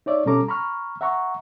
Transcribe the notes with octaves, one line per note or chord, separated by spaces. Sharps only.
D#4 C#5 D5 E5
B2 G3 C#4 A4 A#5 D6
A#5 B5 C#6 F6
E5 F#5 A#5 C#6